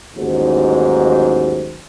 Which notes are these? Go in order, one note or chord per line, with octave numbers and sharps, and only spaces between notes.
A1 D#2 G#2 F#3